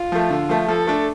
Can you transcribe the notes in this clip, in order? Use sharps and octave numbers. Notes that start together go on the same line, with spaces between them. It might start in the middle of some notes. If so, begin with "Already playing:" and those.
Already playing: F4
F3 A3
D3
F3 A3
F3 A4
A3 D4